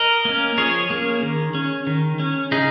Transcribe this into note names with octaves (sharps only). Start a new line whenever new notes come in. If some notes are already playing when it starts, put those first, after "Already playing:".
Already playing: A#4 D#5
A#3 C#4
F3 G#4 C#5
A#3 C#4
D#3
C#4
D#3
C#4
C#3 D#4 G#4